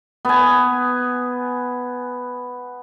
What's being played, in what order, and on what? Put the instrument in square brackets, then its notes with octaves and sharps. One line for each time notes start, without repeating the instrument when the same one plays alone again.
[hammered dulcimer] B3 G#5